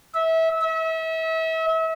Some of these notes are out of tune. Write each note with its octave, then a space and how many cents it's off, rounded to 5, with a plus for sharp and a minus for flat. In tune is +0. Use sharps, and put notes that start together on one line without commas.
E5 -25
E5 -35